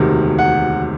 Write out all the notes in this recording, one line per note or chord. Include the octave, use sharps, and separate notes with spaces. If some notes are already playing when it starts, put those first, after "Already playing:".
Already playing: E1 D2 C3 D#3
F#5